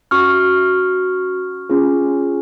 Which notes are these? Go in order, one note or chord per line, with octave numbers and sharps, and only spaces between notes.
C#4 F#4 C#6 F6
C#4 F4 G#4